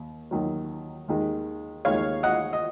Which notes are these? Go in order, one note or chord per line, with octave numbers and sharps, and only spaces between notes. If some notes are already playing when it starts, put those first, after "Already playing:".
Already playing: D#2
D#2 D#3 F#3
D#2 D#3 G#3
D#2 D#3 G#3 C#5 F5
D#5 F#5
D#5